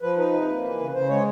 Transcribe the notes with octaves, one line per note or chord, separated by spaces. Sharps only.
F3 B4
D#4 B4
C3
A#3
E3
C#3
C#3 C5
G#3 C#5